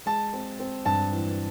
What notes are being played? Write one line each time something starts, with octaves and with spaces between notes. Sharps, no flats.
G#3 A5
C4
C4
G2 A5
E3